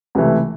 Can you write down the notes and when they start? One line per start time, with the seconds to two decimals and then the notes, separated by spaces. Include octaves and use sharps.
0.15 C#2 C3 E3 A3